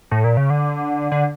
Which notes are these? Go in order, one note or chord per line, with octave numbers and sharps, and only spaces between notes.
A2
A#2
C#3
D3
D3